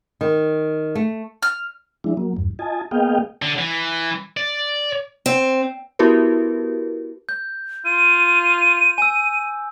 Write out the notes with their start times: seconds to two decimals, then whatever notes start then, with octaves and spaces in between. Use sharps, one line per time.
0.21 D#3
0.95 A3
1.43 F6
2.04 F3 G#3 D4 E4
2.17 F#3 A#3
2.37 E2 G2
2.59 F4 D#5 G#5 A5
2.91 A#3 B3 G#4 D#5 F5 G5
3.42 D3
3.59 E3
4.37 D5
5.26 C4
5.99 B3 E4 F#4 G4 A#4 B4
7.29 G6
7.85 F4 D#7
8.98 G#5 E6